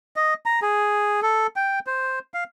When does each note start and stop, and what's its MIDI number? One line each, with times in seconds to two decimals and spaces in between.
0.16 0.34 75
0.46 0.60 82
0.62 1.21 68
1.22 1.47 69
1.56 1.79 79
1.87 2.19 72
2.34 2.44 77